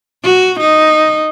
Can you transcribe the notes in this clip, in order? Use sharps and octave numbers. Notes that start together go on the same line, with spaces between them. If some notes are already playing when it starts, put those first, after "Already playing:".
F#4
D#4